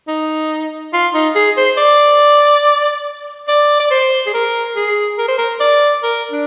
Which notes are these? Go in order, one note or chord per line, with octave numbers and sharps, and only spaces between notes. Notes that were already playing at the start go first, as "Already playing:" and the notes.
D#4
F4
D#4
G#4
C5
D5
D5
D5
C5
G#4
A#4
G#4
A#4
C5
A#4
D5
A#4
D4